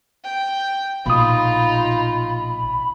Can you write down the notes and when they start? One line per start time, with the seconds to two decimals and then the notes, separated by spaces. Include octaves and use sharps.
0.24 G5
1.06 A#1 B2 D#4 F4 B5 D#6